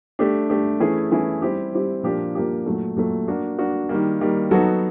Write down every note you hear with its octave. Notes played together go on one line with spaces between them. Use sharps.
A3 D4 G4
A3 D4 G4
E3 A3 C#4 E4 G#4
E3 A3 C#4 E4 G#4
G3 C4 E4 G4
G3 C4 E4 G4
A#2 F3 A#3 D4 G4
A#2 F3 A#3 D4 G4
A#2 F#3 A3
A#2 F#3 A3
A#3 D4 F#4
A#3 D4 F#4
D#3 G3 A#3
D#3 G3 A#3
F#3 B3 D#4 F#4 A4